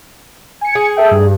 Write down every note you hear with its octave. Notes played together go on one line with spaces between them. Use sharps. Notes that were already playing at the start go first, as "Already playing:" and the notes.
G#5 C#7
G#4
A4 E5 G5
G2